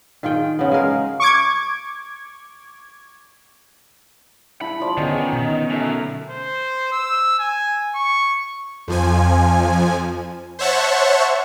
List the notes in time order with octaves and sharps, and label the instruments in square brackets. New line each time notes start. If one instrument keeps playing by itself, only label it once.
[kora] D#3 F4 G#4 G5
C#3 B3
G#3 G#4 A#4 F5
[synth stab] C#6 D6 G#6
[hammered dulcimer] E4 A5 [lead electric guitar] B5
[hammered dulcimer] F3 D5
[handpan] D3 G#4 [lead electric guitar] D#3 [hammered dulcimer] B3 C#4 D#4
[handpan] B2
[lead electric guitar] F#2 [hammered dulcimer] A3
[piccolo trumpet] C5
E6
G#5
C#6
[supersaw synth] F2 F3 G#5
C5 C#5 E5 F#5 A5 C#6